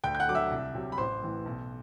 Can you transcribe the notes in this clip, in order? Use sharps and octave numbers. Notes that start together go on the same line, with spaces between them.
D2 G5 G6
G6
F#5 F#6
D3 F#3 D6
E5 E6
C2
C3 F#3
B5
A1 C5 C6
A2 E3
B1